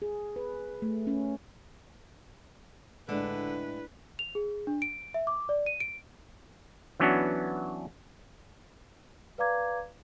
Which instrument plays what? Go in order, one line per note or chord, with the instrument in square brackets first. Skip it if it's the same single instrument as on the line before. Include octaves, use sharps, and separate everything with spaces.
[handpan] G#4
B4
A3
C#4
[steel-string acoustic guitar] A2 G#3 [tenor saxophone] D3 [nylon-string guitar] D4 [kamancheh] B4
[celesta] F7
G#4
D4
D7
E5
D6
D5
D#7
D7
[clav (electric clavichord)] E3 F#3 B3 C#4 D4 F#4
[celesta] B4 D5 F5 A#5 D6 G#6